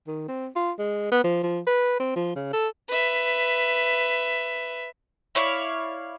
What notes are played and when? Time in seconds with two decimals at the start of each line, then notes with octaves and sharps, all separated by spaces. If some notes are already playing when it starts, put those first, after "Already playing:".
0.07 D#3
0.28 C4
0.56 F4
0.79 G#3
1.12 B3
1.24 F3
1.43 F3
1.67 B4
2.00 C4
2.16 F3
2.36 C#3
2.53 A4
2.89 B4 E5
5.35 E4 C#5 D5 F5